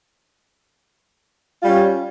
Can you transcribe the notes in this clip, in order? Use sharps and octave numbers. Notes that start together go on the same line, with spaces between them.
G3 C#4 F4